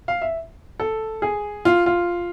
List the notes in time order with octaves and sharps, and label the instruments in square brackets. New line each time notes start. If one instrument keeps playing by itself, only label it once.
[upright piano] F5
E5
A4
G#4
F4
F4